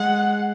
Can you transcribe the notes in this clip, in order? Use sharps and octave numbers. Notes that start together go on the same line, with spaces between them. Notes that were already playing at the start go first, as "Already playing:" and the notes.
Already playing: G#3 F#5